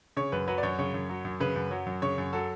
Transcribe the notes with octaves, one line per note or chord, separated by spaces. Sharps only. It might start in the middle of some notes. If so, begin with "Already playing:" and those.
C#3 C#5
F#2 B4
F#3 B4
D5
F#2 C#5
C#3 C#5
F#2
F#3
F#2
C#3 B4
F#2
F#3
F#2
C#3 C#5
F#2
F#3 A4